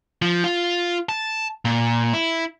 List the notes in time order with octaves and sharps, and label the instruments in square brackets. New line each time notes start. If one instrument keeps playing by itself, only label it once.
[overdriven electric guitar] F3
F4
A5
A#2
E4